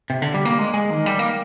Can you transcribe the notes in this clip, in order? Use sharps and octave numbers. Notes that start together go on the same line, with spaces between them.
C3
D3
G3
A#3
G#3
G#3
D#3
G3
A#3